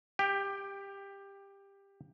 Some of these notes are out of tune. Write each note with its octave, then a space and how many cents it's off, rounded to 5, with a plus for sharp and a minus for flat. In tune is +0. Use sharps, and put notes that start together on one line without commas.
G4 +15 G5 +0